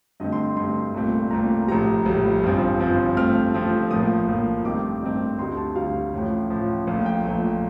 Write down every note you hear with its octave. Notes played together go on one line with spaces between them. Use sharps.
G2 D3 A3 C4 D#5
C6
G2 D3 A3 C4 C6
C2 A#2 A3 C4
C2 A#2 A3 C4 A#5
A#1 A2 G3 A#5
A#1 A2 G3
G1 G2 F3 C4
G1 G2 F3 C4
G2 F3 A3 C4 F6
G2 F3 A3 C4
A#1 A2 F3 A#3 D#6
A#1 A2 F3 A#3
G2 D#3 A3 C4 D6
G2 D#3 A3 C4
D2 D3 G3 C6
A5
D2 D3 G3 F5
A1 A2 F3
A1 A2 F3
A#1 A#2 A3 F5
G5
A#1 A#2 A3